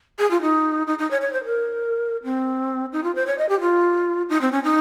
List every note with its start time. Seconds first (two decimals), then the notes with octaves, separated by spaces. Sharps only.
0.19 G#4
0.31 F4
0.42 D#4
0.87 D#4
0.99 D#4
1.11 C#5
1.21 C#5
1.33 C5
1.45 A#4
2.24 C4
2.93 D#4
3.04 F4
3.15 C5
3.27 C#5
3.38 D#5
3.49 G4
3.61 F4
4.29 D#4
4.41 C4
4.52 C#4
4.64 D#4